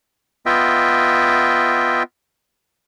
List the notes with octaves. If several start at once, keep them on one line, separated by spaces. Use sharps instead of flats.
B3 F4 D#5 E5 G5